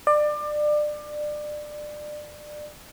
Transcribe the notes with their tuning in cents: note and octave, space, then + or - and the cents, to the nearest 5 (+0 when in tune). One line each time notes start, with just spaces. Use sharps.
D5 +25